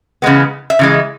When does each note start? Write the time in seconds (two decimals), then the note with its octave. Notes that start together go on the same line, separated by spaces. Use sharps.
0.22 C#3 E3 G#3 B3
0.70 E5
0.79 C#3 E3 G#3